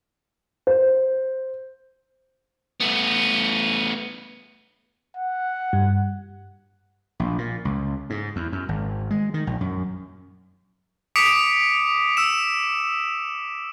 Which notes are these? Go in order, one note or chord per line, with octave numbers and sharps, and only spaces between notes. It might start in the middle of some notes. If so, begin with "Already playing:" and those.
C5
A3 B3
F#5
G2
A#1
A#2
C#2
G#2
E2
F#2
G#1
G#3
D#3
A#1
F#2
D6 D#6 B6 C#7 D7 F7
E6 E7